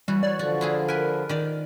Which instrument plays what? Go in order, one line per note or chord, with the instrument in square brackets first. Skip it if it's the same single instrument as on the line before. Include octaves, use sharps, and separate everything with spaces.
[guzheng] E3 F#4 [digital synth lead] G3
[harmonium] C#5 [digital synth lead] D5
[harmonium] D3 F3 [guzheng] F#4
[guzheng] E4 F4 G#4
[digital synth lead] A#4 [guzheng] B4 G#5
[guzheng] D#3 D5